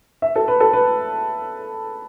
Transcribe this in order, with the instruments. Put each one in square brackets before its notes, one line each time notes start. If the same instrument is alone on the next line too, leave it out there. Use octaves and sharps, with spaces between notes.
[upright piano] E5
A4
B4
A4
B4